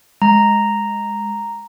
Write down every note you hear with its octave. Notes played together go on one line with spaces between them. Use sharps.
G#3 A#5